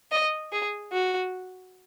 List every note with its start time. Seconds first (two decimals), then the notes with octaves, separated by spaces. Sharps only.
0.11 D#5
0.52 G#4
0.92 F#4